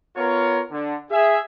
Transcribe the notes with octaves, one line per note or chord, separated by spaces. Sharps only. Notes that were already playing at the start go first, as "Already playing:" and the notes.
B3 F4 A#4 C#5
D3
G#4 E5